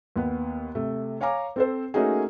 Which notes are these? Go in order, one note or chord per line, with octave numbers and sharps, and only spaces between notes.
D#2 B3
C3 A3
C#5 F5 G#5 A#5 D6
C4 A4 C5
A3 A#3 C#4 D#4 F#4 G#4